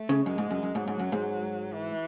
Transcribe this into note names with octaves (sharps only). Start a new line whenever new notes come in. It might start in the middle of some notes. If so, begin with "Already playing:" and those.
Already playing: A3
C#3
F#2 G#3
G#2
F#2
F#2
G#2 F#3
G#2
F#2
G#2
E3